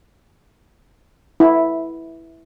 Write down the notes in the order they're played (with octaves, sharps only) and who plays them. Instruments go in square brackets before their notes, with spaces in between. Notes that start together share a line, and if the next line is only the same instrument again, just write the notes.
[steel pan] E4